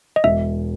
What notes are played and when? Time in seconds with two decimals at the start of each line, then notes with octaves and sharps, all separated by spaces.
0.16 D#5
0.24 E1 E5